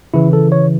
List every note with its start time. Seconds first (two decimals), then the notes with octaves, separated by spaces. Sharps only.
0.14 C#3 E3 E4
0.33 A4
0.52 C#5